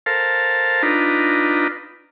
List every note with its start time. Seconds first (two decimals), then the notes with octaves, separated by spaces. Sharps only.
0.06 A4 A#4 C5 F5 A5
0.83 D4 D#4 F4 B4 A#5